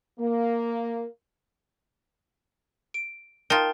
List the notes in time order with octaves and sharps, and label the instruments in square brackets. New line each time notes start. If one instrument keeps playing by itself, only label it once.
[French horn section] A#3
[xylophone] D7
[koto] D#4 F4 [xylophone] A#4 G5 A5